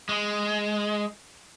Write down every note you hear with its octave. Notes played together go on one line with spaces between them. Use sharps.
G#3